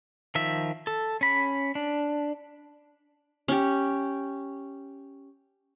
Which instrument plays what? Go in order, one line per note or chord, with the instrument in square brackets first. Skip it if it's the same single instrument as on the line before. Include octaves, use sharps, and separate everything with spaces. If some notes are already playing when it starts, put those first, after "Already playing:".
[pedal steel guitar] D#3 F3 E5
A4
C#4 B5
D4
[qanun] C#4 G4